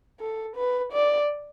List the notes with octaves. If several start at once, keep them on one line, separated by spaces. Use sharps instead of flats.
A4
B4
D5